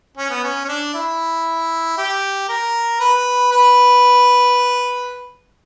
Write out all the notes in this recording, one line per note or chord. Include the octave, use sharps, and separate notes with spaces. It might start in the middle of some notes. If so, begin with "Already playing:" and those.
C#4
B3
C#4
C#4
D4
E4
G4
A#4
B4
B4